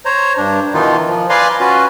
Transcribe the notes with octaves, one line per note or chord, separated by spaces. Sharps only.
C5 C#5 A#5
G2 D4
B2 D#3 E3 D#4 F4
F3
B4 D5 F5 G#5 A#5 C6
C#4 F4 F#4 B4